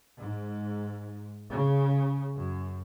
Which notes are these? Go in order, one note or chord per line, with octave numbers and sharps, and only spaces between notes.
G#2
C#3
F#2